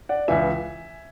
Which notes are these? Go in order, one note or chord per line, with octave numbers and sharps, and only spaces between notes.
D5 F#5
C#2 C#3 E3 E5 G#5